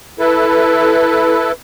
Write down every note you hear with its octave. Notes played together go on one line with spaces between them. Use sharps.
E4 A4 B4